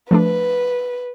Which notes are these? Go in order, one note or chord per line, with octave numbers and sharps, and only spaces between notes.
F3 A3 D4 B4